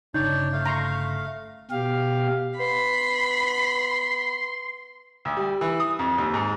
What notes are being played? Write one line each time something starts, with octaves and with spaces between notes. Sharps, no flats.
G1 C#3 D4 D#4 C#5 D5 G6
A3 F5
A#5 C6 C#6
B2 G4 F5
B3 B5 C6
D2
G3
E3
D#6
F2
D#2
G#2